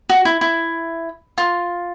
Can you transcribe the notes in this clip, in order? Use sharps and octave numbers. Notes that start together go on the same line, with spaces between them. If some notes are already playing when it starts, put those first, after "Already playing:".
F#4
E4
E4
F4